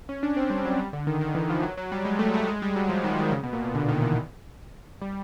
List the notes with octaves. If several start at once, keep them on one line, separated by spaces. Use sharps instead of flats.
C#4
D4
C4
G3
F#3
G3
D3
D#3
D#3
E3
F3
F#3
F#3
G3
G#3
A3
A3
G#3
G3
F#3
F3
D#3
D#3
C#3
B2
A#2
B2
D3
D#3
E3
G3